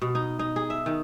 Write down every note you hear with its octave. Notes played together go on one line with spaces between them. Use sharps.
B2
D#4
D#4
G#4
E5
D#3